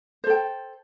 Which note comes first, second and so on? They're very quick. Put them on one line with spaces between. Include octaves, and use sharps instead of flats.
C5 A4 G5